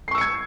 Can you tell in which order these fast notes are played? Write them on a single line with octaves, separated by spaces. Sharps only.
C7 C#6 E6 C#7 G#6